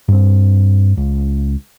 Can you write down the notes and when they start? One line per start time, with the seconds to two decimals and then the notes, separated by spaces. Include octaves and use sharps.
0.08 G2 C4
0.97 C#2